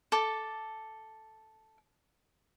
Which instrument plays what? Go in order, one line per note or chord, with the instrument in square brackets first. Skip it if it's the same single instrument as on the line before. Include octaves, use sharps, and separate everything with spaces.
[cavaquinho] A4 D6